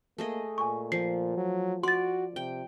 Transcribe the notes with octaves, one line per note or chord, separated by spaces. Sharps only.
A3 A#3 G#4 D#5
A#2 G#5 C#6
F3 C7
F#3
F#4 D5 C6 A6
C3 G5